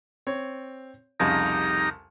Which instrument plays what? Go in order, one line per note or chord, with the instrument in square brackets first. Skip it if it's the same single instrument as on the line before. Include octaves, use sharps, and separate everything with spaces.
[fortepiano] C4 C#5
[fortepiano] C2 F2 C#3 [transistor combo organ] D#4 G4 A#5